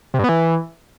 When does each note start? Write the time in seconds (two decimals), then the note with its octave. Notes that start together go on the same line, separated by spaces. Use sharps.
0.14 C3
0.19 G2
0.24 B3
0.29 E3